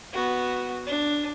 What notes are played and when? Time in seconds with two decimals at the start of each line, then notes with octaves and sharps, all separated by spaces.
0.13 B3 F#4
0.86 D4